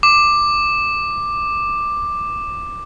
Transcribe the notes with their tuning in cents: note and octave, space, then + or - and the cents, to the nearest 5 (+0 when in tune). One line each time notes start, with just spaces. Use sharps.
D6 +10